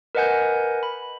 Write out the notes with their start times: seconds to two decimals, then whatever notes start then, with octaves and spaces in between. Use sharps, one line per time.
0.15 A#4 B4 D#5 F#5 G#5 G6
0.83 B5